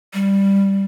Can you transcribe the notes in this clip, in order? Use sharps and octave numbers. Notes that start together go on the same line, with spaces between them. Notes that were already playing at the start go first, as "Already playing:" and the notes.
G3